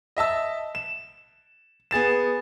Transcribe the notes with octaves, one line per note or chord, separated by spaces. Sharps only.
D#5 E5 A5 E6
E7
B3 G#4 A6 E7